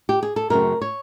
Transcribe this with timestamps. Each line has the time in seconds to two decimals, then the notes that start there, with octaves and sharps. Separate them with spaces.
0.09 G4
0.23 G#4
0.36 A4
0.50 F#2 C#3 F#3 A3 C4 A#4
0.82 C#5